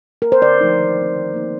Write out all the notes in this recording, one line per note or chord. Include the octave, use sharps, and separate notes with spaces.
A#4
C5
D3 D5
F3 A3 D#4
D#3
A3 C4
D#3
A#3 D#4